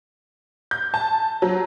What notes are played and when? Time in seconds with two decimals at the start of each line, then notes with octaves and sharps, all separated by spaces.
0.71 G6
0.94 A5
1.42 F#3